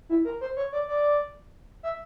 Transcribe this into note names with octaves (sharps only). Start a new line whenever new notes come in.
E4
A#4
C5
C#5
D5
D5
E5